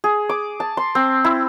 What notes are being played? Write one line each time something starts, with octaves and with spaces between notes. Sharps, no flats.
G#4
D6
A5
C6
C4
E4